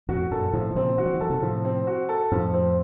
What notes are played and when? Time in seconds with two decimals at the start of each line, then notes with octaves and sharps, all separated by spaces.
0.09 F2 A2 F#4
0.31 F#2 A#2 A4
0.53 A2 C3 F3
0.70 D#3
0.75 A#2 C#3 C4
0.98 D#3 F#4
1.06 F3
1.14 D#3
1.21 F3 A4
1.30 C3 D#3
1.42 A2 C3 F3
1.65 C4
1.87 F#4
2.09 A4
2.31 F2 A2 F3
2.54 C4